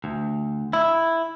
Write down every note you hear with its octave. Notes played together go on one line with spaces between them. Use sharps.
D2
E4